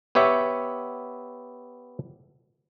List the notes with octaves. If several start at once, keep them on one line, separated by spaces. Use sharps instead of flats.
B3 G4 C#5 E5